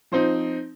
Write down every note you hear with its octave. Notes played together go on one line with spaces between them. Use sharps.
F3 C4 D#4 C5